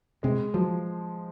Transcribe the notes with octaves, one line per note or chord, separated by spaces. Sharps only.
C3 G#3
F3 F#3